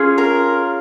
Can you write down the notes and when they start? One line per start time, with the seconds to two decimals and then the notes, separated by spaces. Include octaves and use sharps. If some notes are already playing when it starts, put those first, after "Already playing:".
Already playing: C#4 F4 G#4
0.18 A#4